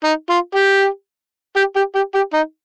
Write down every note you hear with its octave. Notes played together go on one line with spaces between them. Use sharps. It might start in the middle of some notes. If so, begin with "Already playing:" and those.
D#4
F4
G4
G4
G4
G4
G4
D#4